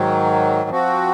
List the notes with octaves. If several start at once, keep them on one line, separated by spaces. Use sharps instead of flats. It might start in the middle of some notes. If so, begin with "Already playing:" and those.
Already playing: G#2 D#3 F#3
F3 C4 F#4